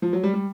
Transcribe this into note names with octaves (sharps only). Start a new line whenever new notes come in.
F3
F#3
G3
G3